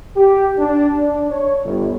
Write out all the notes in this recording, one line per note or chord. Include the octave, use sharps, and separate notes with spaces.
G4
D4
D4
C#5
G1